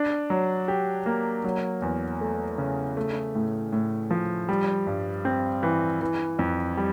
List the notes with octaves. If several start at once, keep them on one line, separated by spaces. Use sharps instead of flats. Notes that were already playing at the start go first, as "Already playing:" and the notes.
Already playing: D4
F#3
G4
A#3
F#3
E2
A3
C#3
A3
A2
A2
F3
G3
G2
C4
E3
E3
F2
G3